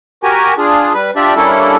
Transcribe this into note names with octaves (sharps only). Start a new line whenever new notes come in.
F#4 G4 A#4 G#5
D4 F4 G#4
G3 B4
D4 F4 G4 D5 E5
G3 A#3 C#4 D4 E4 A4